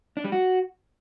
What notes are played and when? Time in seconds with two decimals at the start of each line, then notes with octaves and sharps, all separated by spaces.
0.17 D4
0.24 G3
0.32 F#4